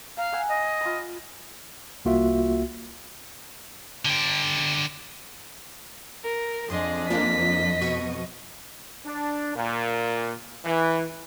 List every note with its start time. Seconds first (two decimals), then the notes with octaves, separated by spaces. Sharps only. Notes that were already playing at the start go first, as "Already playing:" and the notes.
0.17 F5 A#5
0.33 F#5 G#5 E6
0.49 D#5
0.81 F4 B5
2.05 C2 A#3 F4 F#4 E5
4.05 D3 G4
6.23 A#4
6.70 F2 D4 G#4 D#5 C6
7.10 A#3 D4 F4 D#5 B6
7.81 B2 C#6 D#7
9.05 D4
9.55 A#2
10.65 E3